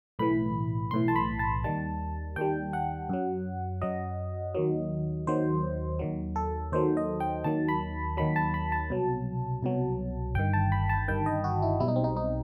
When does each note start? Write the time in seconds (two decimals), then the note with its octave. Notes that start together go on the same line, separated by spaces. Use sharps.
0.19 B1 A2 E3 B5
0.91 B1 A2 E3 C6
1.08 A5
1.16 B5
1.39 A5
1.64 D#2 D#3 G3 A5
2.36 D#2 D#3 G3 G5
2.73 F#5
3.09 F#2 F#3
3.82 F#2 F#3 D#5
4.55 D#2 D#3 F#3
5.27 D#2 D#3 F#3 C5
5.99 D#2 D#3 F#3
6.36 A4
6.72 D#2 D#3 F#3 C5
6.97 D#5
7.20 G5
7.44 D#2 D#3 F#3 A5
7.68 B5
8.17 D#2 D#3 F#3 B5
8.36 A5
8.54 B5
8.72 A5
8.90 C2 B2 F#3
9.63 C2 B2 F#3
10.35 G1 G2 D#3 G5
10.53 A5
10.72 B5
10.89 A5
11.08 G1 G2 D#3 G5
11.26 D#5
11.44 F#4
11.62 E4
11.80 B1 B2 G3 E4
11.88 D#4
11.96 C4
12.04 D#4
12.16 D#4